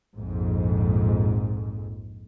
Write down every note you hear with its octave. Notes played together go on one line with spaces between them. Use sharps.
A#1 F2 G#2